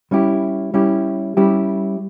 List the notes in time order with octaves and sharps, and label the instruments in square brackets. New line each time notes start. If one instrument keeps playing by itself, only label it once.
[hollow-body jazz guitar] G3 C#4 E4 G4
G3 C#4 E4 G4
G3 C#4 E4 G4